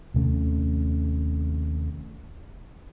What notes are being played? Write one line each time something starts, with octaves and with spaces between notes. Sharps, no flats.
D#2 C3 A3 C#4